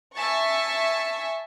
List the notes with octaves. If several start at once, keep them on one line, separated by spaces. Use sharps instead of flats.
E5 G#5 A5 C#6